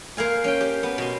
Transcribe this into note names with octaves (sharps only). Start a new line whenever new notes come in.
A#3 C5 F5 G#5
C#4 G5
G4
B3
B2 C6